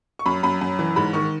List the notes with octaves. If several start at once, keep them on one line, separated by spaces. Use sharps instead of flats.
C#6
F#2 B5
F#2 B5
F#2
E3
G#2 B5
D#3 C#6